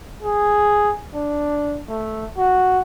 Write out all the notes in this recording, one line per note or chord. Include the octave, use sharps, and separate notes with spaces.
G#4
D4
A3
F#4